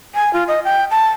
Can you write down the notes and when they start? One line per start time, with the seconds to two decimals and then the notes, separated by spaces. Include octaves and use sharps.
0.15 G#5
0.33 F4
0.48 D#5
0.64 G5
0.91 A5